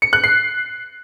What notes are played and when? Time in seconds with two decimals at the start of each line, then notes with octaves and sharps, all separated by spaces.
0.02 C#7
0.13 F#6
0.24 C7